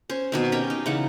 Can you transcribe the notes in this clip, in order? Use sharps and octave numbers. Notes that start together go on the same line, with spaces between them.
C#4 C5
B2 D#3 C4
C#4 G4 A#4 G5
D#4
C#3 E3 D#4 F#5